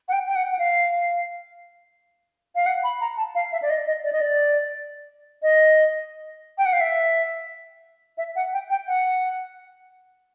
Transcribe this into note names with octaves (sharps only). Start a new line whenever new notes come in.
F#5
G5
G5
F#5
F#5
F5
F5
F#5
B5
A#5
A5
F5
E5
D5
D#5
D#5
D5
D#5
D5
D#5
G5
F#5
F5
E5
E5
F#5
G5
G5
F#5